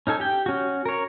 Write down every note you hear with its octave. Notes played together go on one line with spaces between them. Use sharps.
C#4 D#4 A4 G#5
G4 G5
C#4 F#4
A#4 C#5